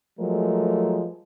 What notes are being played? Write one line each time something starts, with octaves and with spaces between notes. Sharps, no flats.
F3 F#3 G#3 A3 A#4